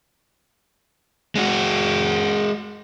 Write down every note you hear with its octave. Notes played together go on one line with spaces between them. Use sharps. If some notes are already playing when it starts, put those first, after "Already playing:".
G#3 F#4